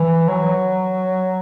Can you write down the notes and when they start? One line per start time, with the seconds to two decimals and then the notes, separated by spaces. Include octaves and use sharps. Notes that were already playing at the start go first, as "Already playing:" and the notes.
Already playing: E3
0.28 F#3